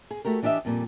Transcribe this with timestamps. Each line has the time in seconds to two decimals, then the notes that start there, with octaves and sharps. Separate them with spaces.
0.11 G#4
0.25 A3 F#4 G4 A#4
0.43 E3 D4 G4 D#5 E5
0.65 F2 A#2 G3